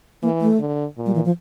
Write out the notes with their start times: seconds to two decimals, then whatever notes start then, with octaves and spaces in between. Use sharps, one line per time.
0.23 E3 A#3
0.41 A3
0.59 D3
0.97 A#2
1.06 G3
1.15 E3
1.25 F3